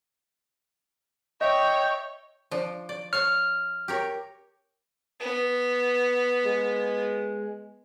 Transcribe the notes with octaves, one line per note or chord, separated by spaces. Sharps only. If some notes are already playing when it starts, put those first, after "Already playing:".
C#5 D#5 E5 G5
F3 D4
D5
C#5 F5 A5 F6
G4 A#4 C#5
B3
G#3